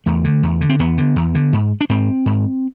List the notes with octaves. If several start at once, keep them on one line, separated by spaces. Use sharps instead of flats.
E2 A3
D3
E2
D3
C4
E2 B3
D3
E2
D3
G#2
D4
G#2 C4
G#2